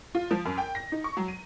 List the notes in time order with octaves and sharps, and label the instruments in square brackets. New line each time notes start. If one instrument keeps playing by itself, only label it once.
[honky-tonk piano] F4
F3
F#2
G5
A#6
D#4
C#6
F#3
D#7